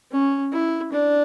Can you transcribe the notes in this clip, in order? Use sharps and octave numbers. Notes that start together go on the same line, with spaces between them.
C#4
E4
D4